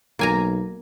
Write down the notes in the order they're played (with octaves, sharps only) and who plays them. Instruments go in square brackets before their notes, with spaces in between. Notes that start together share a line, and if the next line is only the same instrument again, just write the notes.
[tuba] B1 [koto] A#3 G#5 A#5